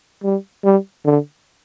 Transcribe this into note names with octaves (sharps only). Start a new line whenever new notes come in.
G3
G3
D3